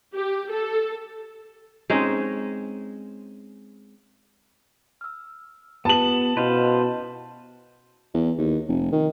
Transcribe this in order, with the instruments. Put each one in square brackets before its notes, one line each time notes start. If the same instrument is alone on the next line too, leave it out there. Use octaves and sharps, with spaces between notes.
[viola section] G4
A4
[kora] G#3 C4 C#4 D#4
[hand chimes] E6 F6
[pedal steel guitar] B3 [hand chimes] F4 G4 B4 [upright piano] A5 F#7
[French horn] B2 [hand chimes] C#4 E4 D#5 [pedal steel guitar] B4 C5 F5
[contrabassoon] E2
D#2
F1
D#3